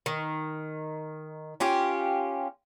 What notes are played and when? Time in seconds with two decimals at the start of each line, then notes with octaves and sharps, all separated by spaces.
0.06 D#3
1.60 C#4 F4 G4